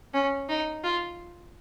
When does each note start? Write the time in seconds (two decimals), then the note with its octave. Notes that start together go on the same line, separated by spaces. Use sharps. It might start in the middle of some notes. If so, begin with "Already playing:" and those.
0.14 C#4
0.49 D#4
0.84 F4